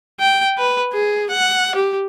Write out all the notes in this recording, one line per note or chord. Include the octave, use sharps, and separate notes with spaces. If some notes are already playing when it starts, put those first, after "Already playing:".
G5
B4
G#4
F#5
G4